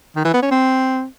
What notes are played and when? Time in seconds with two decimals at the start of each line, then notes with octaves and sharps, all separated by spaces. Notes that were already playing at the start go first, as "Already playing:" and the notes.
0.16 D#3
0.25 E3
0.33 B3
0.42 C#4
0.51 C4